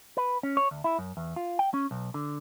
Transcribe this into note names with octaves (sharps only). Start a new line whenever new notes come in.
B4
C#4
C#5
D2
E4
F#2
E2
F4
G5
C#4
B1
D3